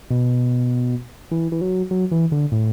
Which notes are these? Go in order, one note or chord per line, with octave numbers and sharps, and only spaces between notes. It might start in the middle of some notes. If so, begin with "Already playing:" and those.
B2
E3
E3
F#3
F#3
E3
D3
A2